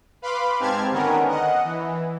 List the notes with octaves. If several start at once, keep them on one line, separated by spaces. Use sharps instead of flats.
B4 F5 B5 C6 D6
G#2 C4 G4 A5 F6 G#6
D3 D#3 B3 C#4 A#4
D#5 F#5
E3